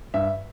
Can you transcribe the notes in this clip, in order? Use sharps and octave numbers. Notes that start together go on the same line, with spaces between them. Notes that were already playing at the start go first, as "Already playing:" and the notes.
G2 E5